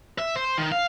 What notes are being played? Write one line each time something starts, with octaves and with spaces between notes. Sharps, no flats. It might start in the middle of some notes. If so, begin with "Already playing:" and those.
E5
C5
D#3
F5